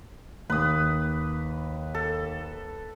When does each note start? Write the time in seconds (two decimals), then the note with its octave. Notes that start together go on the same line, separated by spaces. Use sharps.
0.50 D#2 B4 D#6
1.94 A4